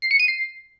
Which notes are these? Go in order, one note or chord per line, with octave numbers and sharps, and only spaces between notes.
C7
C#7
D#7
C7